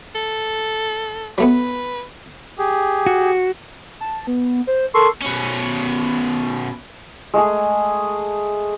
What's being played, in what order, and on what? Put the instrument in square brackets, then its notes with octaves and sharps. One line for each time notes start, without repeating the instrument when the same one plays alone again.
[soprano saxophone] A4
[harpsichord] F#3 A3 B3 [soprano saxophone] B4
[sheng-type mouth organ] G4 G#4
[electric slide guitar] F#4
[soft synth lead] A5
B3
C5
[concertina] A4 C6 C#6 [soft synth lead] A#4
[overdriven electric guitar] B2 C#4
[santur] G#3 A3 G#4